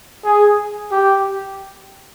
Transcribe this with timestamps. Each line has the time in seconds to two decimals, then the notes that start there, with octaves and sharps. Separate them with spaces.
0.24 G#4
0.91 G4